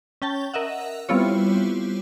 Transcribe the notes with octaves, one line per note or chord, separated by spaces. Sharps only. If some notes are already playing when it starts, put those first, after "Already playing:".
C#4 G5 A5
A#4 D#5 E5 F#5
G3 B3 C4 E4 F4 C#5